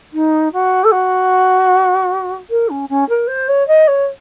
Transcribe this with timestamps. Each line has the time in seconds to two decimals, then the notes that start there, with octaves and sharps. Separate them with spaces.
0.13 D#4
0.53 F#4
0.84 A4
0.92 F#4
2.50 A#4
2.69 C#4
2.89 C#4
3.09 A#4
3.27 C5
3.48 C#5
3.68 D#5
3.87 C#5